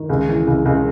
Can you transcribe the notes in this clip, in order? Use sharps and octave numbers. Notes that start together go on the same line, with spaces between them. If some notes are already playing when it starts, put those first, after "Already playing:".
Already playing: D#3
C#2
E3
C#2
C#2